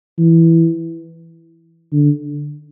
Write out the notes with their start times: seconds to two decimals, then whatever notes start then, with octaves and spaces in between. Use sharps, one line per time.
0.18 E3
1.92 D3